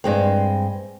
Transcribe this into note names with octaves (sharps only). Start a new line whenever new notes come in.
G2 G#3 C4